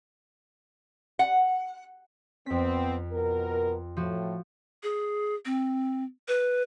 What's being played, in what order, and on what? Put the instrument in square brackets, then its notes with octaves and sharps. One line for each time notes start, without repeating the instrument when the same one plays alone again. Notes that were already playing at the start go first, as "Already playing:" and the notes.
[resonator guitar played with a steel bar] F#5
[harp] F2 B6 [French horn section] B3 C4
[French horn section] B2 B3 A#4
[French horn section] A2 [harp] F3 F#4
[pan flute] G#4
C4
B4